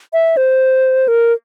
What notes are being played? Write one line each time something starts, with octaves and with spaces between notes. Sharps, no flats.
E5
C5
A#4